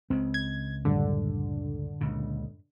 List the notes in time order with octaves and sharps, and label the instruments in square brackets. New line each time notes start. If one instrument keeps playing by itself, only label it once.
[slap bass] C#2 C#3 [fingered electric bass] C4
[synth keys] G#6
[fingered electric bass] F#2 A2 G3 [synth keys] D3
[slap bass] C#2 A#2 C#3